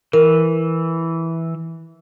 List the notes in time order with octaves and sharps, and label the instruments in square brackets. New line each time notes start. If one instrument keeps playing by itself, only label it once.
[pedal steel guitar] E3 [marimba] A#4